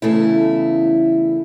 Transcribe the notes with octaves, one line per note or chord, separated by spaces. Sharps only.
E2 C#3 A3 E4